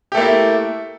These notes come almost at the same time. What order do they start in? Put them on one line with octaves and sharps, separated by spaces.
G4 A3 A#3 E4